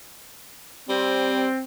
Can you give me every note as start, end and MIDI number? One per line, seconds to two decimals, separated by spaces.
0.89 1.47 55
0.89 1.62 60